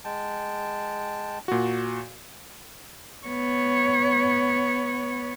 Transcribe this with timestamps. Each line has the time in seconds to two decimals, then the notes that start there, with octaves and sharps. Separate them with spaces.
0.05 G#3 G5 A5
1.48 A#2 F#4
3.26 B3 C#5